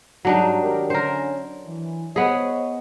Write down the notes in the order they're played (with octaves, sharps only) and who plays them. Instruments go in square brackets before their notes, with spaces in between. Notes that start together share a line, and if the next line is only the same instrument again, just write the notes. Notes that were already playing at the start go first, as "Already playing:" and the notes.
[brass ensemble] G#2 G3 [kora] F#3 D4 D#4
[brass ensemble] G#1 G4 A#4
[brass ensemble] D3 C#4 [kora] A#4 C5
[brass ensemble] E3
[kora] B3 G#4 [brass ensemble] C5 C#5 D#5